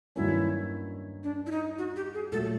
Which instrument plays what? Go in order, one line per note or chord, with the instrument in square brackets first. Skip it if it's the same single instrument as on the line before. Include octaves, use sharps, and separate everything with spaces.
[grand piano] G2 D#3 F#3 A#3 C#4 [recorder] E4
[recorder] D4
E4
D#4
F#4
G4
G#4
[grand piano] A#2 F#3 A3 [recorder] A4